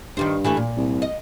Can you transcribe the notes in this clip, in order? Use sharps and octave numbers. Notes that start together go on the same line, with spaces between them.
G2 D#3 G3 C5
E3 G3 A3
A#2
C2
D#5